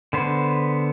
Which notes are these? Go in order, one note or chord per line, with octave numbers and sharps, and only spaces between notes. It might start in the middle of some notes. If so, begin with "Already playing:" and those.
D3 B3 C5